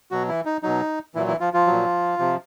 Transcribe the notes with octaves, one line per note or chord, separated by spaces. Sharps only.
B2 F#3 F#4
E3 E4
D#4
B2 F#3 D#4
A#2 E3 F#3 E4
E3 E4
F3 F4
F3 F4
A#2 F#3
C3 F3